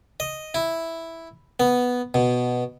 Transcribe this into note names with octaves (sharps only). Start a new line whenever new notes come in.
D#5
E4
B3
B2